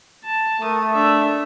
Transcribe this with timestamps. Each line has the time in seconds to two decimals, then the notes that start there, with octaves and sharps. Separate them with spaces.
0.25 A5
0.62 A3 A#4 D#6
0.93 D4 E5